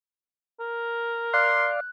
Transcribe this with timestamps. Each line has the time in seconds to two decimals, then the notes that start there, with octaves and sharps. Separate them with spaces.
0.60 A#4
1.34 D5 F5 C6 F#6